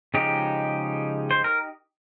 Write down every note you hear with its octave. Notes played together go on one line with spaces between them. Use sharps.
C#3 F3 G#3 D#4 G4
C5
A#4